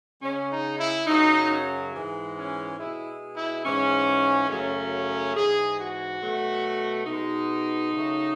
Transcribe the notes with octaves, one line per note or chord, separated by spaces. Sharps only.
C#3 G#3 C#4
D#4
E4
F#2 C#3 F#3 D#4
C#4
G#2 E3 G#3
C#4
B2 G#3 E4
E4
G#2 E3 G#3 C#4
F#2 C#3 F#3 A3 C#4
G#2 E3 G#3 G#4
F#4
B2 F#3 A3
B2 G#3 D#4
C#3 F#3 A3